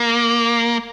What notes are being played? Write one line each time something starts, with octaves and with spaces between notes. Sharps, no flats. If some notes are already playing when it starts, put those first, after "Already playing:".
Already playing: A#3